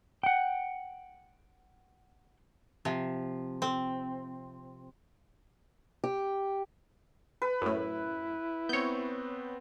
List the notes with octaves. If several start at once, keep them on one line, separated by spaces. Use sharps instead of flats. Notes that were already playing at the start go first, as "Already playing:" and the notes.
F#5 G5
C3 F3
C4
G4
B4
F#2 A2 E4
B3 C4 C#5 G6